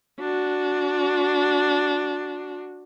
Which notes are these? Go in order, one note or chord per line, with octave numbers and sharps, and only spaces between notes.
D4 F#4